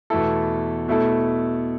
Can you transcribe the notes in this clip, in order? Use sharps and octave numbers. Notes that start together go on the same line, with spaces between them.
E2 B2 A3 E4 A4
B2 A3 E4 A4